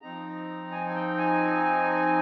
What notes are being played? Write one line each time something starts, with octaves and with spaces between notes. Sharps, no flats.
F3 C4 D#4 A#5
G#5
G#5
G5
G#5